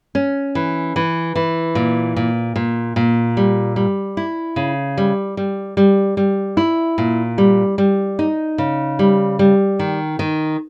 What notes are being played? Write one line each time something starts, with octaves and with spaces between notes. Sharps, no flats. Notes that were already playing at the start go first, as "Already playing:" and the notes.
C#4
E3
E3
E3
A#2
A#2
A#2
A#2
G3
G3
E4
C#3
G3
G3
G3
G3
E4
A#2
G3
G3
D#4
C#3
G3
G3
D#3
D#3